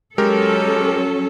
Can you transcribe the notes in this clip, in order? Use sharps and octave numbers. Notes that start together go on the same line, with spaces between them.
F#3 G#3 C#4 G4 A4 A#4